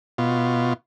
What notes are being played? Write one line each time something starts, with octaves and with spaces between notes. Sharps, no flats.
B2 F4